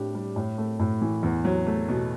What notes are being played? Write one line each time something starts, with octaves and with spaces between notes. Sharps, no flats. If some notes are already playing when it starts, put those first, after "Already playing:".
Already playing: A2 D4 G4
G3
A2
A3
A2
E3
E2
F#3
A3
B2